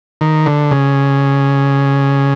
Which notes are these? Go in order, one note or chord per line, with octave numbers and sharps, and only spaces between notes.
D#3
D3
C#3